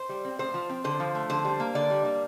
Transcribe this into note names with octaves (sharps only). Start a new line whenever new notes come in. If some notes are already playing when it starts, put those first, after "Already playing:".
Already playing: C5
G3
C4
A2 C5
F3
C4
D3 C5
F3
A3
D3 C5
G3
A#3
D3 D5
G3
A#3